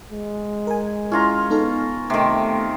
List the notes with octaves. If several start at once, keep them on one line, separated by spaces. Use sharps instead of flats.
G#3
A#4 G#5
C#4 E4 F4 A#5
B3 D#4 A4
C3 D#3 A3